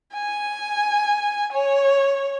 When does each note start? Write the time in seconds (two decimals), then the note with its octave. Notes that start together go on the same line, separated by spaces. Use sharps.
0.14 G#5
1.52 C#5